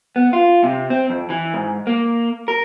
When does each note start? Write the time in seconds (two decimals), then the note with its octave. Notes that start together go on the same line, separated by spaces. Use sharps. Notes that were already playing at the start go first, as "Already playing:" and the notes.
0.16 B3
0.33 F4
0.64 C3
0.90 C4
1.10 F2
1.30 E3
1.54 G#2
1.87 A#3
2.48 A#4